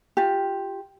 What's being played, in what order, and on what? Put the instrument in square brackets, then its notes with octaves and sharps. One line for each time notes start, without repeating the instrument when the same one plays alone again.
[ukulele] F4 G4